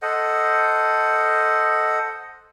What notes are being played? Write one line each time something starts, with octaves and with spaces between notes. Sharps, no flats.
A4 C5 D#5 F#5